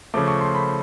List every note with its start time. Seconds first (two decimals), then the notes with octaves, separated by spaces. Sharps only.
0.14 C#3 F3 A3 D6
0.28 C#6
0.41 C6
0.55 B5